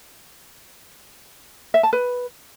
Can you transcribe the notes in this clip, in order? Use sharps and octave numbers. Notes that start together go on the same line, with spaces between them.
E5
A5
B4